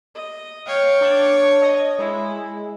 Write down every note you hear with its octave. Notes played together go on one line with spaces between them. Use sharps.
D#5
C#5 F5 G5
D4
D#5
G#3 E4